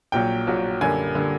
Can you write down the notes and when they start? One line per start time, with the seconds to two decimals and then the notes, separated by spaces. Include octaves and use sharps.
0.12 A#1 A#2 F#3 G5
0.47 A#1 A#2 F#3
0.81 F#2 D3 G3 A#3 G#5
1.15 D3 G3 A#3